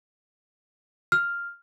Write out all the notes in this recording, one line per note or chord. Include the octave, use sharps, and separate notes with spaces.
F6